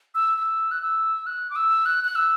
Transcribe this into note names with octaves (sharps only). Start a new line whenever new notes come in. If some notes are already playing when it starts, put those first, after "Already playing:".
E6
E6
F#6
E6
F#6
D6
E6
F#6
F#6
E6